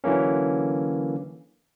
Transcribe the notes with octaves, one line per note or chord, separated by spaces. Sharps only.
D3 E3 F#3 A#3 C#4